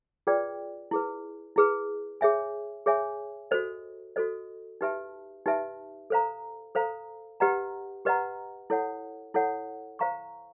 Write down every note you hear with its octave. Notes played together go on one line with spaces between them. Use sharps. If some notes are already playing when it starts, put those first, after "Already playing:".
F4 G#4 B4 D5 G5
E4 G#4 B4
E4 G#4 B4
G#4 C#5 E5 G#5
G#4 C#5 E5 G#5
F#4 A4 C5 D#5
F#4 A4 C5 D#5
D#4 G4 B4 E5 A5
D#4 G4 B4 E5 A5
A4 C5 F5 A#5
A4 C5 F5 A#5
G4 B4 D#5 F#5 A#5
G4 B4 D#5 F#5 A#5
E4 A4 C#5 F#5
E4 A4 C#5 F#5
C5 F5 A#5 C#6